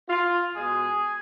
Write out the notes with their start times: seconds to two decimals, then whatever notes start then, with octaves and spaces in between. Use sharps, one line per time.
0.10 F4
0.53 B2 G#3 G#4